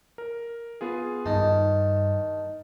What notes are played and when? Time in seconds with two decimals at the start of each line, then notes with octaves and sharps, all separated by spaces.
0.18 A#4
0.81 B3 F4 G#4
1.26 G2 D#3 A5